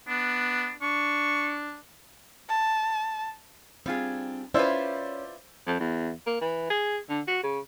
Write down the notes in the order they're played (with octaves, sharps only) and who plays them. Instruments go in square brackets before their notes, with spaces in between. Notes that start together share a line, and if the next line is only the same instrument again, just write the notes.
[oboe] B3 [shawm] D4
[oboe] D4 [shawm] C#6
[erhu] A5
[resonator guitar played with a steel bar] G3 F4 G#4 [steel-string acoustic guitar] C4 D4
[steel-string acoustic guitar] C#4 [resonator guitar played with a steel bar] E4 F4 B4 [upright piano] C5 D5 E6
[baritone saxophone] F2
E2
A#3
E3
G#4
D3
F#4
C#3